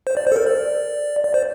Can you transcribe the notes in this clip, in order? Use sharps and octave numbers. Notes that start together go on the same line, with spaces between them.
C5
D5
C5
A4
A#4
D5
D5
C5